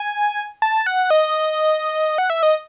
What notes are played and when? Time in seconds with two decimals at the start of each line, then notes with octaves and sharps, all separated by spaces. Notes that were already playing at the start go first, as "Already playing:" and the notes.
Already playing: G#5
0.62 A5
0.86 F#5
1.10 D#5
2.18 F#5
2.30 E5
2.43 D#5